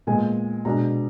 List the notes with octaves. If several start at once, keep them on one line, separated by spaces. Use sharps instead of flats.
A#2 G#3 B3 G#5
B2 G#3 D4 A#5